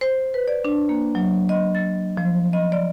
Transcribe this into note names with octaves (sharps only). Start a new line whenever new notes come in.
C5
B4
D5
D4
A#3
F#3
D#5
A6
F3
D#5
D5